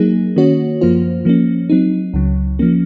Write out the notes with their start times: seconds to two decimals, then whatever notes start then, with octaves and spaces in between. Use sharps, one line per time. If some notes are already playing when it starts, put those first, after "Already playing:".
Already playing: F#3 A#3 D#4 G#4
0.36 D#3 A#3 C#4 F#4 C#5
0.81 F#2 F3 A#3 F4 C5
1.25 F3 A#3 C#4
1.70 F#3 C4 D#4
2.14 C#2 C#3 F#3
2.59 F3 A#3 C#4